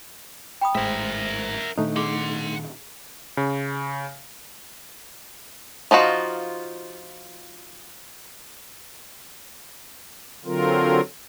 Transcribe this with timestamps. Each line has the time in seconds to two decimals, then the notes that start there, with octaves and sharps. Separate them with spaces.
0.61 G5 B5 D#6
0.75 G#1 A2 G#3 A#4 C5 E5
1.78 A#2 D#3 A3 D4 D#4 C5
1.96 G#4 F#5 C6
3.37 C#3
5.91 F3 D#4 F4 F#4
10.45 D3 F#3 C4 F4 A#4